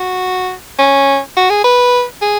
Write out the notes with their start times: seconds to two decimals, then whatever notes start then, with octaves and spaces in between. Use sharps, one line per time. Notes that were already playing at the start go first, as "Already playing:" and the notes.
Already playing: F#4
0.79 C#4
1.37 F#4
1.50 G#4
1.64 B4
2.22 G#4